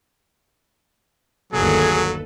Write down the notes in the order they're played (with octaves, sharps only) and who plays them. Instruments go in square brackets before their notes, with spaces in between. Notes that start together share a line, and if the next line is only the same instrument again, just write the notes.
[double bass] G1 D#2 [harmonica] F#3 [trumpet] G#4 [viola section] A4 B4